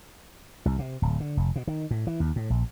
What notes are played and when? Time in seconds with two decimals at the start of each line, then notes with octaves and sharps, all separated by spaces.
0.66 C2
0.79 C3
1.02 D1
1.20 D3
1.37 F1
1.56 B2
1.67 D#3
1.91 A2
2.07 E3
2.20 D#2
2.36 A2
2.50 A#1